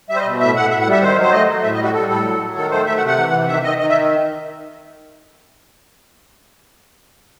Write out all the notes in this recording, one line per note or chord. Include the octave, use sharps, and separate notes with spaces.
G3 E5
C5
D#5
B2
A2 E5
A2 F#5
A2 E5
F#5
G3 E5
D#3 C5
F#3 C5
A3 D#5
A3
A2 E5
D#5
G3 F#4
G3 A4
A2 A4
F#3
F#3
D#3 A4
A3 C5
A3 E5
F#5
C3
F#5
E3
C3
D#3 E5
D#3 D#5
D#3 D#5
E5